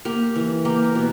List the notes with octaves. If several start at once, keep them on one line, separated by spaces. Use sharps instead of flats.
A#3 G4
E3
A#3 G4
A#4
B2